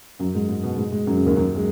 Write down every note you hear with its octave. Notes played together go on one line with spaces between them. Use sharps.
F#2 F#3
G#2 G#3
G#2 G#3
B2 B3
G#2 G#3
G#2 G#3
F#2 F#3
C#3
D#2 D#3
F#2 F#3
G#3